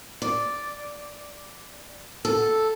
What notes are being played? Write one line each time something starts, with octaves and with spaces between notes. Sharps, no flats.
D5
A4